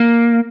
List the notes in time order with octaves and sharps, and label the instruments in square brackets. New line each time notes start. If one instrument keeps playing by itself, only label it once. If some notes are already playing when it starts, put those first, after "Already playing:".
Already playing: [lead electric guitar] A#3